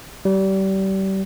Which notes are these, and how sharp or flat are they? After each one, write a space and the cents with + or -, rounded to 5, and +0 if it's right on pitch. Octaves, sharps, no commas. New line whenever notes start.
G3 -30